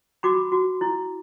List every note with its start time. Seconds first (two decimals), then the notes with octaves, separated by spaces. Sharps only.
0.23 F#4 B5 D6
0.52 F#4
0.81 E4